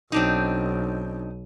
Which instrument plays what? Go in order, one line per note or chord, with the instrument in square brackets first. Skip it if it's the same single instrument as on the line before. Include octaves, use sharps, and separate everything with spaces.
[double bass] B1 [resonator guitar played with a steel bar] C4 D4 D#4